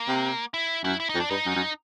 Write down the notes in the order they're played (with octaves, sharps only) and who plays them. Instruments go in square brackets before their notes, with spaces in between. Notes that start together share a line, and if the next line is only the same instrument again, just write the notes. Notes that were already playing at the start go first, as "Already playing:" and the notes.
Already playing: [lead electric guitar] A#3
[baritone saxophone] C3
[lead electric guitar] E4
[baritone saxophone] F#2 [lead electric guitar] E4
[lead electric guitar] E4
D#4
[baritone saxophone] F2
[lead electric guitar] D4
[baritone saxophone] G2 [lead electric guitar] D#4
[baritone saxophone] F#2
F#2